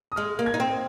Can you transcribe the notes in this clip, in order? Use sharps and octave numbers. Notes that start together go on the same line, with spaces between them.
D#6
G#3 F6
A#3
G#6
D#4
C4